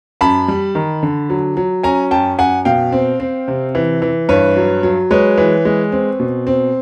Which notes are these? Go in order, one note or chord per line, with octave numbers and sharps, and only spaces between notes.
F#2 A5 B5
G3
D#3
D3
F#3
F#3
C#4 G#5 A#5
F#2 G5 A5
F#2 F#5 G#5
B2 F5 G5
C4
C4
C3
E3
E3
G2 B4 C#5
F#3
F#3
G#3 B4 C#5
E3
G#3
C4
B2
C4